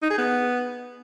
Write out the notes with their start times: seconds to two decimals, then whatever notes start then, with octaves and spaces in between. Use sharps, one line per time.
0.02 D#4
0.10 G#4
0.18 B3